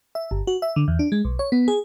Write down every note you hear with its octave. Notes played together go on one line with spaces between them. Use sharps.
E5
G1
F#4
E5
D3
E2
D4
G#3
B1
C#5
B3
G#4